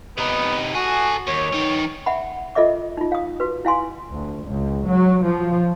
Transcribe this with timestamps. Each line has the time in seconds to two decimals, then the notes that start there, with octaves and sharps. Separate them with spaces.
0.17 C3 B3 D#4
0.75 F#4 A4 G#5
1.27 D#2 C#5
1.53 E3 D#4
2.06 E5 F#5 B5
2.55 F4 A4 D#5 E5 D6
2.97 D#4 F4
3.12 F5 D#6
3.40 F#4 B4
3.65 E4 F5 G#5 C6
4.11 D2
4.46 C#2
4.88 F#3
5.24 F3